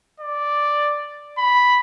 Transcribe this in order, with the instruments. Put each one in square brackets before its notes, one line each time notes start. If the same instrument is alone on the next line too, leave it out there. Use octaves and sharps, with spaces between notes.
[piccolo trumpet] D5
B5